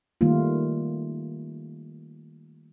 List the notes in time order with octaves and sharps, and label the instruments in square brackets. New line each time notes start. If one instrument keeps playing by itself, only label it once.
[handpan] D#3 G3 A3 A#3 F4